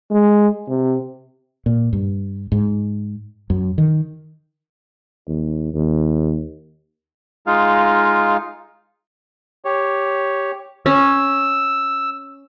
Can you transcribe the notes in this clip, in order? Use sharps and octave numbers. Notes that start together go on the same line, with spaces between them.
G#3
C3
A#2
G2
G#2
F#2
D#3
D#2
D#2
G#3 D#4 F4 F5
G4 C#5
C#4 E6